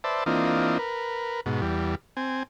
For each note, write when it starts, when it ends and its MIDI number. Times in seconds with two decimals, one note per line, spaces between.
0.04 0.24 71
0.04 0.24 72
0.04 0.24 74
0.04 0.24 76
0.04 0.24 81
0.26 0.78 52
0.26 0.78 58
0.26 0.78 60
0.26 0.78 62
0.26 0.78 65
0.26 0.78 75
0.79 1.41 70
0.79 1.41 71
1.46 1.61 44
1.46 1.61 47
1.61 1.95 40
1.61 1.95 55
2.17 2.43 60
2.17 2.43 80